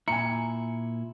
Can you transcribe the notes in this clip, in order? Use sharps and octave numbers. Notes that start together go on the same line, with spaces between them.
A#2 E4 G#5 A#5 C#7